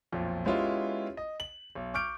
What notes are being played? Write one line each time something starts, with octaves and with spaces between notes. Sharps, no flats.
B1 F2 A#2
G#3 B3 C#4 E4 F4 G4
D#5
F#7
B1
C#6 D6 F6 G6 D7